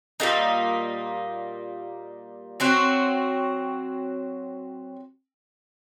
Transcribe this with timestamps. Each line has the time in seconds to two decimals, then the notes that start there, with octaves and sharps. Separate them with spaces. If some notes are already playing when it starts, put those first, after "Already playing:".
0.20 A#2 G3 A#3 D#4
2.60 F#3 C4 F#4